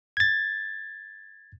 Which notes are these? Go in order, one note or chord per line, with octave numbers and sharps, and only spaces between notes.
G#6 A6